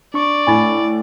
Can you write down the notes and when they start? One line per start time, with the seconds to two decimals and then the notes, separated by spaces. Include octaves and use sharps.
0.14 D4 D5 C#6
0.47 A2 G#5 B5 A6